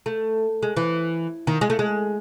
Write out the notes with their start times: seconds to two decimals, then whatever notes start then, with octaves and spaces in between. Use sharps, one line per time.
0.06 A3
0.63 G#3
0.77 E3
1.47 D#3
1.61 G#3
1.70 A3
1.79 G#3